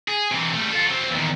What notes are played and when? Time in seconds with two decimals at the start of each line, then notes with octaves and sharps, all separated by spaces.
0.08 G#4
0.31 C3 E3
0.54 G3 A3
0.72 F4 A4
0.86 F#3 C4
1.11 E2 D#3